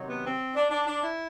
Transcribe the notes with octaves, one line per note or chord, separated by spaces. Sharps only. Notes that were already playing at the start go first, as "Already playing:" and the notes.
Already playing: C3 D#3 F#3
B3
C4
D4
D4
D4
E4